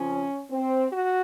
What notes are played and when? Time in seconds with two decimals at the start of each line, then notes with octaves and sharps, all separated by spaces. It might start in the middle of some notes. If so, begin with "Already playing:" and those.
Already playing: F2 C#3 F3 C#4
0.50 C4
0.92 F#4